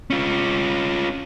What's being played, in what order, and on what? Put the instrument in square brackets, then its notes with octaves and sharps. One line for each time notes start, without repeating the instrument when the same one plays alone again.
[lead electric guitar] C#4 F4